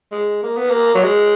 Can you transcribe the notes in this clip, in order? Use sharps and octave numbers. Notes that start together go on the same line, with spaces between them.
G#3
A#3
B3
A#3
F#3
G#3